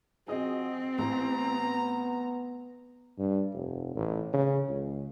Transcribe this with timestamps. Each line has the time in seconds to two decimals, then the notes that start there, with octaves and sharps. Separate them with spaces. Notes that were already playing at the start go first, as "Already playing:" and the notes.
0.28 F3 C4 F#4 G#4 D#5
0.98 A1 B3 A#5
3.18 G2
3.54 F1
3.96 A1
4.33 C#3
4.69 C#2